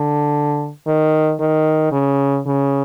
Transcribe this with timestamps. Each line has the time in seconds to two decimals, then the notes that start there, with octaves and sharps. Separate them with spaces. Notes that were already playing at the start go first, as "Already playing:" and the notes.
Already playing: D3
0.87 D#3
1.40 D#3
1.92 C#3
2.46 C#3